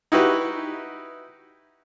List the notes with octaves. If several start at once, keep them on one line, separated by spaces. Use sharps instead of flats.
D#4 E4 F#4 G4 B4